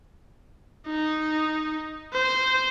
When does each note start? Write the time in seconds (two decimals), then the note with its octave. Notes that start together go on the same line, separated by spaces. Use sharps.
0.87 D#4
2.13 C5